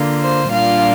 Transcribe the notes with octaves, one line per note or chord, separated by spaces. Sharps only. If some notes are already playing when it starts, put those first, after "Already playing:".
Already playing: D3 A#3 F4
C5
A#2 G3 D4 F4 F5